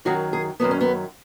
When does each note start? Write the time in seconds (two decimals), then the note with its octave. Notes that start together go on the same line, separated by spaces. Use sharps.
0.05 F#2 D#3 F#3 F#4
0.33 G#4
0.60 F#2 D#3 F#3 B3
0.71 C#4
0.81 B3